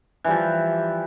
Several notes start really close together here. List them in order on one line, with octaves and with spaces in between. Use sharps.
E3 G3 F3